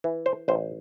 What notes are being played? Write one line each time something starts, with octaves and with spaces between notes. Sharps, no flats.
E3
C5
A1 C5